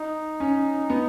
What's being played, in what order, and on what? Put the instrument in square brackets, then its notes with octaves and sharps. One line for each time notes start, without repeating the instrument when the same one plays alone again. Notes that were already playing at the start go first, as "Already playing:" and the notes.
Already playing: [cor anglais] D#4
[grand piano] C#4
B3